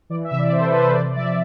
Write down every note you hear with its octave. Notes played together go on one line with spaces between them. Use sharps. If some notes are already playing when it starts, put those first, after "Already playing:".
E3 D5
E5
C3
D5
C3 C5
A4
B4
E3 C5
B4
C3 D5
D5
F3 E5